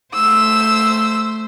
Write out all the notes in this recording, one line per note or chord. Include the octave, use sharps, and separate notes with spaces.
A3 C5 E6